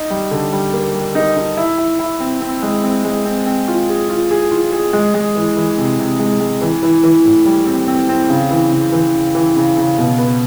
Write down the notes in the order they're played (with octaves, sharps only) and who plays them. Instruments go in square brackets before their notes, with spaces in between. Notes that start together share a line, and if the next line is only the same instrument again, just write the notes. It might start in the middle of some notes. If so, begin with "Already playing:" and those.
Already playing: [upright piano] D#4
G3
D3
G3
A#3
G3
D#4
D#4
E4
E4
E4
C4
C4
G#3
C4
G#3
C4
C4
F4
G#4
F4
G#4
F4
G#4
G#3
G#3
E3
E3
C3
C3
G#3
G#3
E3
E3
E3
A2
G3
C4
C4
C4
C#3
E3
C#3
E3
C#3
E3
C#3
C#3
B2
B3